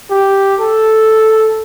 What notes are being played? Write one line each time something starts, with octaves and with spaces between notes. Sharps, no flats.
G4
A4